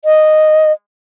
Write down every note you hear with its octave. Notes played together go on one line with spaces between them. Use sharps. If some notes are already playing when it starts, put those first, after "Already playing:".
D#5